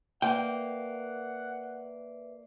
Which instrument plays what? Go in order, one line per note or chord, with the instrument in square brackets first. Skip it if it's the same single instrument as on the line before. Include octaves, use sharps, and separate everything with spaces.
[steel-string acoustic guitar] A#3 [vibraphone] B4 D5 E5 [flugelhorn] F#5 [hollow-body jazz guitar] G5